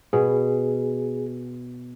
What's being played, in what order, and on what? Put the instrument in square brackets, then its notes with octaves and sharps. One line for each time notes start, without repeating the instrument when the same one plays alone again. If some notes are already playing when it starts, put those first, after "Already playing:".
[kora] B2 [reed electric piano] G#4